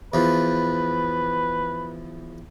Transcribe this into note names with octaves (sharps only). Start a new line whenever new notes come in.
E2 F3 B4